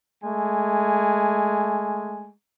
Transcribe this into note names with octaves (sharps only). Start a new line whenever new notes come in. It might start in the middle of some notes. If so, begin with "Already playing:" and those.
G#3 A3 G#5